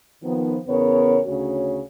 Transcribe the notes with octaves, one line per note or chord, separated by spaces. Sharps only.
D#3 F3 B3
E2 C#3 B3 A#4 C#5
D2 C#3 F#4 C#5